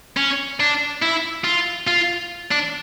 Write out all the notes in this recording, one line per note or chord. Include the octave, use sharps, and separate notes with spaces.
C#4
D4
E4
F4
F4
D4